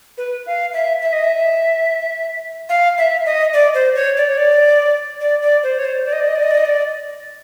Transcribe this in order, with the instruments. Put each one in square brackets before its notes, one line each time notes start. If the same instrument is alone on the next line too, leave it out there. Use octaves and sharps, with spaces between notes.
[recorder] B4
F5
E5
E5
D#5
E5
F5
E5
D#5
D5
C5
C#5
D5
C#5
D5
D5
D5
C5
C#5
C5
D5
D#5
D5
D#5
D5
D#5
D5
D#5
D5